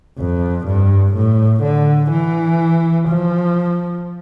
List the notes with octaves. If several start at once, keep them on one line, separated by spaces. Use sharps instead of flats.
F2
G2
A2
D3
E3
F3